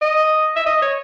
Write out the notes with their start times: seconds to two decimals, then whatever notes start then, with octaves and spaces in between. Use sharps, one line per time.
0.02 D#5
0.56 E5
0.66 D#5
0.82 C#5